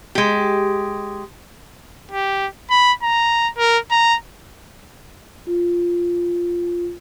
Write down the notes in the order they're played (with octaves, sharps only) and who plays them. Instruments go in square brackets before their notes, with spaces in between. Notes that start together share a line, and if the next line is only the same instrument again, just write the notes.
[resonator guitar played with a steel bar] G#3 G4
[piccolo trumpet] G4
B5
A#5
A#4
A#5
[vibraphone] F4